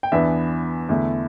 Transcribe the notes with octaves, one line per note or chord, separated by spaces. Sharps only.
G5
E2 E3 B3 D4 E5
E2 D3 A3 E4